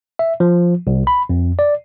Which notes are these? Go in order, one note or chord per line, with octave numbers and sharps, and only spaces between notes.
E5
F3
C2
B5
F2
D5